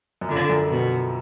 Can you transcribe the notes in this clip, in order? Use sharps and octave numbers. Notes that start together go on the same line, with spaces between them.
F#2
F2 D3
F#2
B2